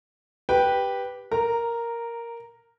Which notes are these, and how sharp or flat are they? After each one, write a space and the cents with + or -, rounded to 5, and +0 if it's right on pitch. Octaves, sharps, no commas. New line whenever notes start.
G4 +0 B4 -10 G5 +0
A#4 +0 A#5 -15